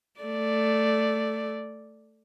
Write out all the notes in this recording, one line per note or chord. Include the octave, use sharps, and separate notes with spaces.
A3 D5